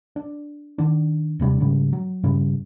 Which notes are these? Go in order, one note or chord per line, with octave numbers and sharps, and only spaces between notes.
D4
D#3 D4
D#1 C3 G3 D4
G#2 C#3 G3
F#3
G2 C#3 G3